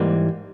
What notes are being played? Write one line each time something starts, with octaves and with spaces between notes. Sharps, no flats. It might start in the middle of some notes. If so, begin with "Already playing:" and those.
Already playing: G#2 E3 G3 A#3